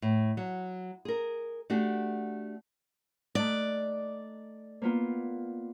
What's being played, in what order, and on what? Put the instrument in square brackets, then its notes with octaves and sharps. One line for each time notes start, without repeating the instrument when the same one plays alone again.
[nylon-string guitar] A2
F#3
G#4 A#4
A3 D4 F#4 G4
[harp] A3 D#4 F#6 [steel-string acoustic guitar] D5
[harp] A#3 B3 F4